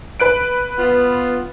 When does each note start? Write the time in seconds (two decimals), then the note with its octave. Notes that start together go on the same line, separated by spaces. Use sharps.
0.20 B4 F#6 D7
0.78 B3 F4